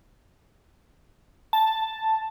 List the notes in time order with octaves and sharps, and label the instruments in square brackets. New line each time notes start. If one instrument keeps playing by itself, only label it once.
[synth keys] A5